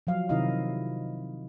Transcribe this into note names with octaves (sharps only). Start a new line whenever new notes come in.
F3 F#3 F5
C3 D#3 D#4 E4 D#5 F5